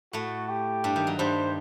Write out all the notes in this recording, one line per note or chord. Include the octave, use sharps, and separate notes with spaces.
A2 A3 F#4
G4
G2 G3
D#3
F#3
G2 G3 C5